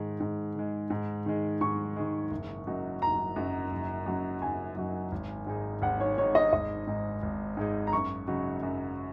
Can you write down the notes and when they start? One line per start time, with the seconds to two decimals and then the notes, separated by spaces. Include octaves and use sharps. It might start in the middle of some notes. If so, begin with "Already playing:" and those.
Already playing: G#2 D#3 G#3
0.20 G#2
0.56 D#3 G#3
0.90 G#2
1.26 D#3 G#3
1.61 G#2 C#6
1.96 D#3 G#3
2.31 F#1
2.67 F#2 F#3 D#4
3.02 F#1 A#5
3.36 F#2 F#3 D#4
3.71 F#1
4.06 F#2 F#3 D#4
4.41 F#1 G#5
4.77 F#2 F#3 D#4
5.12 G#1
5.47 G#2 G#3 D#4
5.82 G#1 F#5
6.00 C#5
6.18 G#2 G#3 D#4 C#5
6.35 D#5
6.53 G#1 D#5
6.87 G#2 G#3 D#4
7.23 G#1
7.57 G#2 G#3 D#4
7.87 A#5
7.93 F#2 C#6
8.28 C#3 F#3 D#4
8.63 F#2